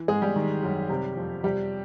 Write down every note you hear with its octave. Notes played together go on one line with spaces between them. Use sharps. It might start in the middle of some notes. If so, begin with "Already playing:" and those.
Already playing: E3
G#2 G#3 G#4
G3 G4
D#3
F#2
C3
F2
C3 G3 G4